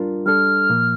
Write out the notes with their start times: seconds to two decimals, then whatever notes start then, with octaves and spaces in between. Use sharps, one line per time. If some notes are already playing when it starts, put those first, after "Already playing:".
Already playing: G3 D4 F4 A#4
0.26 G3 D4 A4 F6
0.70 A#2 F3 A#3